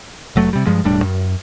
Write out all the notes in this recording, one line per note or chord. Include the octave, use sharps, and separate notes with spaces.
F1 F#3 A3
C3 G3
G2 F3 G#3
E1 A2 G3 D4
F#2